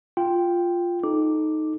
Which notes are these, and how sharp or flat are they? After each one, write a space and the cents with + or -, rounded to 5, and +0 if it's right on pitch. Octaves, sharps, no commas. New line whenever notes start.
F4 +0 G5 +0
D#4 +0 A4 -20 D6 +0